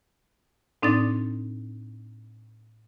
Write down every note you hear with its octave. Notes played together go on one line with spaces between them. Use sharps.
A2 C4 D4 D#4 D5 A6